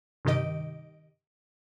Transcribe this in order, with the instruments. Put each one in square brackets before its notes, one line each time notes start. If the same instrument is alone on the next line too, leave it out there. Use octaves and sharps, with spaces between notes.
[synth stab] G2 C3 D#3 G4 D#5 D7